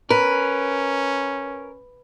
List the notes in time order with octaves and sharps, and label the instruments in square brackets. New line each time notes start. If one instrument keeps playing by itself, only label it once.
[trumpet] C#4 [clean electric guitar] A#4 [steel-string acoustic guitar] B4